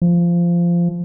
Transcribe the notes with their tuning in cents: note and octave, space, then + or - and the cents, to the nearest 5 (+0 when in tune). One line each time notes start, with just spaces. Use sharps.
F3 -15